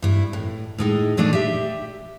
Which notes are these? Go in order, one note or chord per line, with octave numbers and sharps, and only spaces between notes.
G2 E4
A2
A2 G#3 D#4
D#2 A#2 A3 D4 D#4 D#5
G4 E5